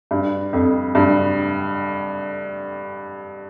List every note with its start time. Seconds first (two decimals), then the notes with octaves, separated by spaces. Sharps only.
0.11 G2
0.53 F2
0.95 G2